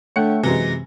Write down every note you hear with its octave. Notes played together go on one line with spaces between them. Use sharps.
D3 A3 C#5 F#5 G5 C#7
F#2 C3 E3 F#3 G#3 A#6